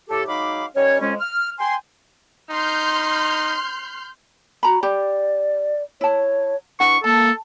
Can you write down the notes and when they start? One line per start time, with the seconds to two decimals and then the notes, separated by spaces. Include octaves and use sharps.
0.09 A2 G4 A4
0.27 F#3 G#3 D#4 F5 B5 D6
0.75 D#3 G3 C#4 C#5
1.01 F2 G#3 C#4
1.20 F6
1.58 G5 G#5 C6
2.51 D#4 C6 F6 G6
4.63 F#4 A#5 B5
4.83 G4 D5
6.01 E4 C#5 A5
6.80 D4 E4 B4 F#5 C#6
7.04 A#3 A4 A5